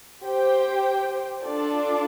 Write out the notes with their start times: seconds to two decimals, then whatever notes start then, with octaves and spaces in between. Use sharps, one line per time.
0.25 G4 C5 G5
1.42 D4 F4 A4 D5 A5